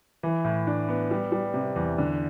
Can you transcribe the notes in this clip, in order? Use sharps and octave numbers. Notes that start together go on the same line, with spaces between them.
E3
A2
D4
B3
G3
G3
C3
E2
D3